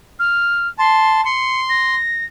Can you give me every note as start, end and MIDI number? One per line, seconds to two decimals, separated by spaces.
0.19 0.68 89
0.79 1.21 81
0.79 1.24 84
1.25 1.95 84
1.25 1.60 97
1.70 2.25 94